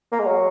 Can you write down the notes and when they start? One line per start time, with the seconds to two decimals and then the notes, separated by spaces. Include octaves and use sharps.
0.12 A#3
0.19 G#3
0.27 F#3